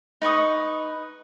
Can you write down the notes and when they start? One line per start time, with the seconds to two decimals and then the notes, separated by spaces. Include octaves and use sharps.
0.22 D#4 B4 C#6 D#6